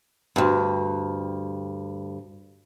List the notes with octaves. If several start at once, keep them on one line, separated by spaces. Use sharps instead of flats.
D2 G2